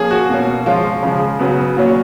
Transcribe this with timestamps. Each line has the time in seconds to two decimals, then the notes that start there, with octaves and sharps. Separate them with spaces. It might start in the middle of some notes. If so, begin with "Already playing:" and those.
Already playing: F3 A#3 C#4 G#4
0.11 F#4
0.30 B2 A#3 C#4
0.66 F3 G#3 C#4 F4
1.03 C#3 F3 G#3
1.39 C#3 F#3 B3
1.77 A#2 F#3 C#4